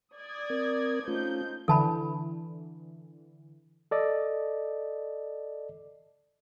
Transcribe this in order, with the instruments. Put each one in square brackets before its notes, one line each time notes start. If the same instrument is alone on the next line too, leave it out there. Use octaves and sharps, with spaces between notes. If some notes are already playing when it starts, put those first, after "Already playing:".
[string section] D5 D#6 G#6
[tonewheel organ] C4 A#4
[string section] F3 D#4 G6 [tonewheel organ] A3 C#4 F4
[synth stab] D3 E3 [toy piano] A4 A5 B5
[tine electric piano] A4 D5 D#5